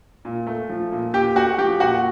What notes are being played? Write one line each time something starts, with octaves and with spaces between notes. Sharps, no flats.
A#2
A3
F3
A#2
A#2 G4 G5
A3 F#4 F#5
F3 G4 G5
A#2 F#4 F#5